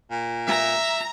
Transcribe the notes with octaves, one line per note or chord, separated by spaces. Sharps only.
A#2
E5 A#5